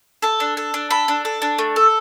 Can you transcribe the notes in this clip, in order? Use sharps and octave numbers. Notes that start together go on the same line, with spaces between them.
A4 A5
D4
A4
D4
A4 B5
D4
A4
D4
A3
A4